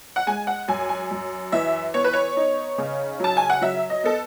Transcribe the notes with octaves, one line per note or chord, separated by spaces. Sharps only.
F#5
G#3 G#5
F#5
F#2 G#5
G#5
F#2
E3 E5
B3 C#5
B4
C#5
D#4
C#3
F#3 A5
G#5
F#5
F#3 E5
D#5
B3 A4